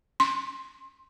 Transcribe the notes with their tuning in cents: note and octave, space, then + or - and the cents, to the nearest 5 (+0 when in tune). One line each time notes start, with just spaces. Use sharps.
C6 +15